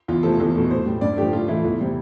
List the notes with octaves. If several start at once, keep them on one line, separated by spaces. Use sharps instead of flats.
E2 F4
C3 F3 A3 A4
E2 A4
B2 A3
A2 C5
G3
G2 D5
F3 A3 G4
A2 F4
E3 A3 E4
E2 E4
C3 G3